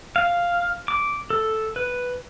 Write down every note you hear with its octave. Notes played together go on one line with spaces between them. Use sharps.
F5
D6
A4
B4